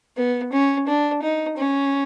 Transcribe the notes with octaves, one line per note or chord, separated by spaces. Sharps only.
B3
C#4
D4
D#4
C#4